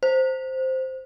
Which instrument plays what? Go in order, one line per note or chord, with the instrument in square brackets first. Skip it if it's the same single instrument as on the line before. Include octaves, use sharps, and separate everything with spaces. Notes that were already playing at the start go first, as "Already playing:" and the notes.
[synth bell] C5